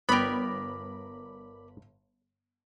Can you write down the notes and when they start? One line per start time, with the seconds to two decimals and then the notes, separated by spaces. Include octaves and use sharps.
0.09 G1 B3 A#4 D5 G5 B5